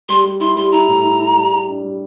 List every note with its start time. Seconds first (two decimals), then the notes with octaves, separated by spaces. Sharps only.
0.09 G3 C6
0.24 G3
0.40 E4 C6
0.56 G3 C6
0.72 E4 A#5
0.88 A2
1.04 E4
1.20 E4
1.36 G3
1.52 G4
1.67 D4
1.83 G3